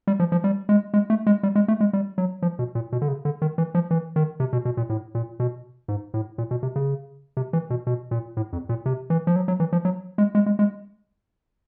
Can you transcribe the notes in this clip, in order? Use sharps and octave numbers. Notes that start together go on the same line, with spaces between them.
G3
F3
F3
G3
G#3
G#3
A3
G#3
G3
G#3
A3
G#3
G3
F#3
F3
B2
A#2
B2
D3
C#3
D3
D#3
E3
F3
E3
D#3
C3
B2
B2
A#2
A2
A#2
B2
G#2
A2
A#2
B2
C3
C#3
C3
E3
B2
B2
A#2
A2
F2
A#2
C3
E3
F3
F#3
F#3
E3
F3
F#3
G#3
G#3
G#3
G#3